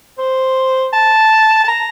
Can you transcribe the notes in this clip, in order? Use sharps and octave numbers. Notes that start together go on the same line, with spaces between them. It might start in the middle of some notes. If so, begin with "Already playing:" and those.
C5
A5
A5
A#5